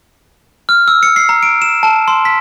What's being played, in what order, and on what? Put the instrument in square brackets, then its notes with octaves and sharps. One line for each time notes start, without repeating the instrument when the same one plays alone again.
[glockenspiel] F6
E6
C#7
C7
A#5
D7
E7
A5
C6
B6